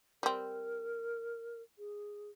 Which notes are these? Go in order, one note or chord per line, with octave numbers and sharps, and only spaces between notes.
G3 C4 A#4
G#4